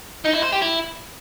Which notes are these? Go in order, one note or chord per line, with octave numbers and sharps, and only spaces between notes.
D#4
E4
C5
G4
E4